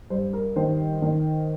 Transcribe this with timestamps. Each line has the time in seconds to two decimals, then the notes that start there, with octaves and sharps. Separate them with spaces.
0.10 G2 C5
0.33 A#4
0.56 D#3 C5
1.02 D#3